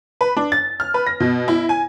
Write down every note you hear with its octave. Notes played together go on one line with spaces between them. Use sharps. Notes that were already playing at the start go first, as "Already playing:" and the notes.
B4
D4
A6
F6
B4
A#6
B2
E4
G#5